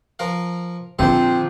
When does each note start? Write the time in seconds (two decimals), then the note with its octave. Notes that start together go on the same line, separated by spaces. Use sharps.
0.19 F3 A#4 F5
0.99 A#1 D3 F3 C4 G#4 A4 C5